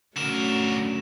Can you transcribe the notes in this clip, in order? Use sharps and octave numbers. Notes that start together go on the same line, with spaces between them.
D3 F#3 A3 C#4 A#4 E7